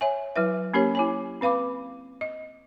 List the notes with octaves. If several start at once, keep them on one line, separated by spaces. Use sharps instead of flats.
C#5 E5 G#5
F#3 E4 B4 E5
A#3 C#4 G4 A#4 C#5
E4 C#5 G#5
C4 B4 F5 B5 D6
D#5